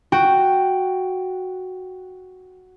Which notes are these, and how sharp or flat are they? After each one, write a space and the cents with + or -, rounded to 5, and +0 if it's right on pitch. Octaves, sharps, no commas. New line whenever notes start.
F#4 +0 G5 +0